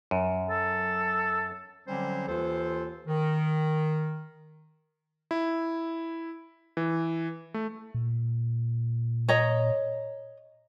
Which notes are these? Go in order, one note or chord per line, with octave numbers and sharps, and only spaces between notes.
F#2
A4
D3 F#3 G3 C4 C#4 C5
D#2 E3 F4 A4 C5
D#3
E4
E3
A3
A#2
C#5 D#5 A#5